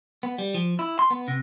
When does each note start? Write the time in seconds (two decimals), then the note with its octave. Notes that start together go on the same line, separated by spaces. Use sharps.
0.23 B3
0.38 G3
0.54 F3
0.79 E4
0.99 C6
1.11 B3
1.28 C3